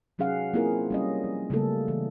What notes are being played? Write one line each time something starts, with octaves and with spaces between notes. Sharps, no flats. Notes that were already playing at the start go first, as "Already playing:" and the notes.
C3 F#3 C#4 G#4 F5 F#5
A#3 C4 E4 F4 G#4 A#4
G3 C#4 D#5
F3
C#3 F#3 G3 A3 A#3 A4
E3